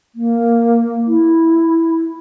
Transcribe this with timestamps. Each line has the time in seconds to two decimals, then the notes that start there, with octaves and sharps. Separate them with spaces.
0.15 A#3
1.07 E4